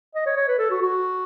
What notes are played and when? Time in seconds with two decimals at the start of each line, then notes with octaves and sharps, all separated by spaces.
0.15 D#5
0.26 C#5
0.37 C#5
0.48 B4
0.59 A4
0.71 F#4
0.82 F#4